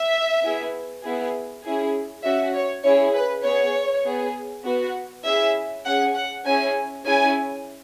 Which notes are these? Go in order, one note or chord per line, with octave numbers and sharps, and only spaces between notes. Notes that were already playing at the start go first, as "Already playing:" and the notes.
Already playing: E5
B3 E4 G#4
B3 E4 G#4
C#4 E4 G#4
C#4 F#4 E5
C#5
C#4 E4 G#4 C#5
B4
B3 G#4 C#5
B3 G#4
B3 F#4
C#4 E4 G#4 E5
C#4 G#4 F#5
F#5
C#4 E4 G#4 G#5
C#4 E4 G#4 G#5